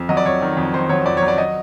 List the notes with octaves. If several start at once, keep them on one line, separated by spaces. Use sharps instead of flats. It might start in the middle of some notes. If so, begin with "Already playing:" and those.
Already playing: F2
F#3 D#5
D5
F2 C#5
D#3
F2
D#3 C5
F#3 C#5
F2 D5
C#5
F#3
D5
D#5